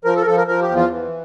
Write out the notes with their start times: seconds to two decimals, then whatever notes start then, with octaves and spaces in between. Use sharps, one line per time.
0.04 F3 A#4
0.16 A4
0.22 A#4
0.26 F3 A4
0.36 A#4
0.47 F3 A#4
0.62 G4
0.69 E2
0.76 F4
0.90 E3